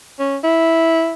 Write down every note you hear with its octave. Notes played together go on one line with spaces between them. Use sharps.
C#4
E4